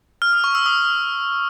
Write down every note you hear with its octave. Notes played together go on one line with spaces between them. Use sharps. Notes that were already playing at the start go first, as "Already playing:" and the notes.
F6
D#6
C#6
E6
D#6